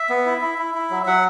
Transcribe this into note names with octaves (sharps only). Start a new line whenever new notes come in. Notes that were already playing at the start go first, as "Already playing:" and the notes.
Already playing: E5
B3
E4
E4
E4
E4
F#3
F#3 F#5